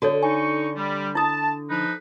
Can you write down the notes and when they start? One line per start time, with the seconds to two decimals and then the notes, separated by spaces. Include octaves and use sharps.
0.02 D3 F#4 A4 C#5
0.23 D#4 G#5 C#6
0.77 G3
1.15 E4 A5 D#6
1.70 F3 D#4 B4